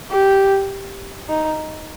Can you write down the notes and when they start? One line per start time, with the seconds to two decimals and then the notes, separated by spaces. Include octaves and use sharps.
0.11 G4
1.29 D#4